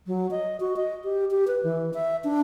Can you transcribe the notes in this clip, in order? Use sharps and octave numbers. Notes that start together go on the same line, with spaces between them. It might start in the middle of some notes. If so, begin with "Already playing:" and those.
F#3
D#5
F#4
D#5
G4
G4
B4
E3
E5
D4